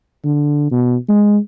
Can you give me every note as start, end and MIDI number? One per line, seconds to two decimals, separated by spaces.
0.25 0.71 50
0.71 0.96 47
1.09 1.38 56